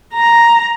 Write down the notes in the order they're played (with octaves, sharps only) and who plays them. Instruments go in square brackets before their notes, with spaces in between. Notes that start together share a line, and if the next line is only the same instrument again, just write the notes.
[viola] A#5